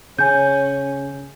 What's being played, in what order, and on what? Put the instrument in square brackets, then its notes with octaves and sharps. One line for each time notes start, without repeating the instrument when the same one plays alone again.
[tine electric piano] C#3 [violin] C#4 [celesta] G#5 G6